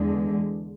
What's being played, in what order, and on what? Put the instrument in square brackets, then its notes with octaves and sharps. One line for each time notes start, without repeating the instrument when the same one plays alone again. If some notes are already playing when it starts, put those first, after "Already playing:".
Already playing: [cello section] E2 D3 G#3